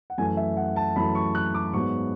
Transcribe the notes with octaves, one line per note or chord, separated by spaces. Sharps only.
F#5
F#2 E3 A3 G#5
E5
F#5
A5
F#2 E3 A3 B5
C#6
F#6
D6
G#2 F#3 B3 C#6